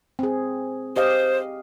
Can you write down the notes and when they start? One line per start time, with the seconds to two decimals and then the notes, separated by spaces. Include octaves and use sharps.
0.19 C4 G#4
0.96 G4 C5 D#5 F5